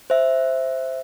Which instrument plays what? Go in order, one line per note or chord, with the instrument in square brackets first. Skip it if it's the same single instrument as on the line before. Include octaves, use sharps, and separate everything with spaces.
[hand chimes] C5 E5